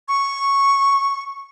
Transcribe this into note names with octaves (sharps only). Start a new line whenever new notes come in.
C#6